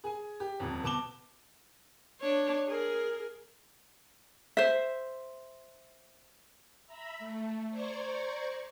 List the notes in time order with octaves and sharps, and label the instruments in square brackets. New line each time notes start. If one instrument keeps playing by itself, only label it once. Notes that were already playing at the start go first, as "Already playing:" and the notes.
[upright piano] G#4 G#5
G4
D#1 F2
B2 A5 D6 E7 G7
[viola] D4 C#5
G#4 A#4
[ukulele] C5 E5
[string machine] E5 A#5 B5
A3
C5 D5 A#5 C#6 G#6